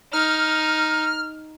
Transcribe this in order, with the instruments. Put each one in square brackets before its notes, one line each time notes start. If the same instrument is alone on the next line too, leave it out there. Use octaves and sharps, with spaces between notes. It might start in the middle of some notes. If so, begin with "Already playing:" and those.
[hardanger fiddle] D#4 [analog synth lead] F6